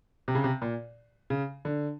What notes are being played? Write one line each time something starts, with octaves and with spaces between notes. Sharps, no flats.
C3
C#3
C3
A#2
C#3
D3